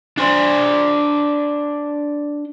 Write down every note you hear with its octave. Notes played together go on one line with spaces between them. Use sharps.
D4 C5